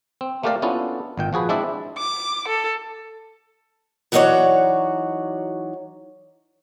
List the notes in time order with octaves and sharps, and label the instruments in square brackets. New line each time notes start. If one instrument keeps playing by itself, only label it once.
[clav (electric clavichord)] C4
A3 A#3 G4 A#4 D5 F5
B3 C#4 D4 E4 F4 A4
G#1 A#2 G5
F3 F#4 G#4 B4
G#3 C4 D4 E4 D5 E5
[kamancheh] D6
A4
[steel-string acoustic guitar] E3 F#3 D#4 F#4 C#5 D5